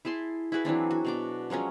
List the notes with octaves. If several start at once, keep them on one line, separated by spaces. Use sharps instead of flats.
E4 G#4 A5 C6
E4 F#4 G#4 B4
E3 F#3 C4 D4
F#4
B2 D4 D6
F3 F#3 G#3 C#4